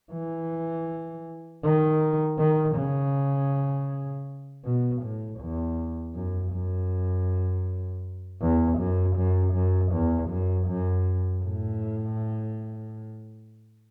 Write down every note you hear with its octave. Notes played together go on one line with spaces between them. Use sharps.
E3
D#3
D#3
C#3
B2
A2
E2
F#2
F#2
E2
F#2
F#2
F#2
E2
F#2
F#2
A2